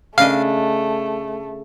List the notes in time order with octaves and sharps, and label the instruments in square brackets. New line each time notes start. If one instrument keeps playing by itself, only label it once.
[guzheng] C#3 D4 D#5 [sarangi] A3 [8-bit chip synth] F5